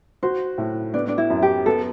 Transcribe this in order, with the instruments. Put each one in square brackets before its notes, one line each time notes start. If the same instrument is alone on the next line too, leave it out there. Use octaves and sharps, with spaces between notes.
[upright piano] F#4 [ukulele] C5
[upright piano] A2
[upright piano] B3 [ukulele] D4
[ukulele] D4
E4
[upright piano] F#2
[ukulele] G4
[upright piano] B3 [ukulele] A4